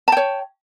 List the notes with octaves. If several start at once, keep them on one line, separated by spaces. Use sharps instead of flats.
C#5 G5 A5